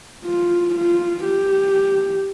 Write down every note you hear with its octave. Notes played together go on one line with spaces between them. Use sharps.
F4
F4
G4